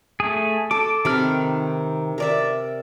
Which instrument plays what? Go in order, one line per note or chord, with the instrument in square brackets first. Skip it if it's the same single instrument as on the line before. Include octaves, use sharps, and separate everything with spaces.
[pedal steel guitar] A3 G#4
[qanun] A4 [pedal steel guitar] D6
[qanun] C3 B5 [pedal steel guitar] D#3 F6
[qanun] A#4 D5 E5